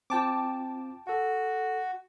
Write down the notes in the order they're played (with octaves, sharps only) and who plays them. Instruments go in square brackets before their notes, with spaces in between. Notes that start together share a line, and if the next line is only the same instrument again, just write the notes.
[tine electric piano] C4 F4 [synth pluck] G5 A5 D6
[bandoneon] F#4 [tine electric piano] A4 F#5